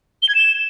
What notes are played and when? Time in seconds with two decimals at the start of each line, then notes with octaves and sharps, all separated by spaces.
0.22 G7
0.29 G#6
0.35 E7